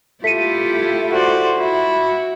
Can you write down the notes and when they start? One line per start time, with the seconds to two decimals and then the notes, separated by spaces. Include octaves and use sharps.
0.24 A3 E4 F4 G4 B6 C#7 D#7
1.10 F#4 C5 D5
1.58 E4 F#4